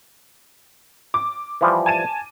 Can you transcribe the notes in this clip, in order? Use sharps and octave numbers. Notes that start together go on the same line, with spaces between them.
D6
E3 F3 G3
G#5 A5 D#7